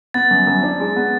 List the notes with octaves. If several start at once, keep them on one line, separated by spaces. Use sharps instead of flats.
B3 A6
F#2
F#2
D4
G#3
B3